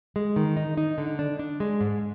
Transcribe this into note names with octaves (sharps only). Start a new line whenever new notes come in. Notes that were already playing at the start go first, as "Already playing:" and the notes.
G#3
D#3
D#4
D#4
D3
D4
D4
G#3
G#2